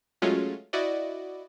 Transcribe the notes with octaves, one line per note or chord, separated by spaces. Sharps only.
F#3 G#3 A3 C#4 F4
E4 F#4 D5 D#5